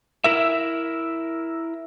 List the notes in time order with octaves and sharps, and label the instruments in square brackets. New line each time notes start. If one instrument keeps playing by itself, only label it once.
[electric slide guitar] E4 A#4 E5